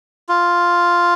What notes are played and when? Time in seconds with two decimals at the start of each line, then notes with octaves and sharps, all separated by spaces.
0.29 F4